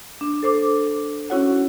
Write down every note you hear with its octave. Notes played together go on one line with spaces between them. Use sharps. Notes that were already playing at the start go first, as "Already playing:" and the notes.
D4
A4 C5 D6
C#4 E4 F#4 C#5 F#5